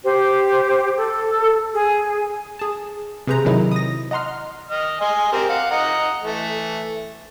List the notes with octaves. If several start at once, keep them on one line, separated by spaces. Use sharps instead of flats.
G4 C5
A4
G#4
G#4 A5
C3 G#4 B4 C5 A#5
C3 D#3 F#3 D#4 E4
D#6 A#6
D#5 F#5 A#5 C6 F6
D#5 F6
D#5 G#5 C6
C4 G4 A#4
F5 F#5
D#5 F#5 A#5
E3 A3